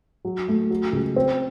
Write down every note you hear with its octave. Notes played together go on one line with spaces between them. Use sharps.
F#3
A3
F#3
C#2
C4